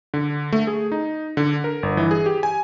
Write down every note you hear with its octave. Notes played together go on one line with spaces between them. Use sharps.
D3
A3
G#4
D#4
D3
A#4
G1
E3
G#4
G4
G#5